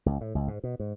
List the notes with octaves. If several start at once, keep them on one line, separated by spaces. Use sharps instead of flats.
C#2
A2
C#2
G#2
B2
G#2